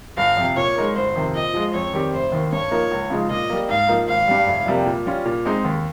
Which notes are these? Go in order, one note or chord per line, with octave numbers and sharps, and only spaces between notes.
G1 F5
F2 C3
A#2 C#5
G#3 D#4 A#4
G1 C5
F2 C3 D#3
A#2 D#5
F3 G#3
F2 C#5
D#3 G3 C4 G4
F1 C5
D#2 D#3
G2 C#5
F3 A#3 D#4 A#4
C#2
C#3 F3 G#3 D#4
A#2 D#5
G3 A#3
G#2 F5
F3 A#3 D#4
G#1 F5
G2 G3
F1
F2 C3 G3 A#3
A#2
G3 C#4 F4
A#2
G#3 C4 D#4
D#2